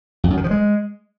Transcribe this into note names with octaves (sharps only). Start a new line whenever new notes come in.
F2
F#2
D#3
F3
G#3